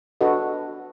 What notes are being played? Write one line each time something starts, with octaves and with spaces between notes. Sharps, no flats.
D4 F#4 A4 B4 D#5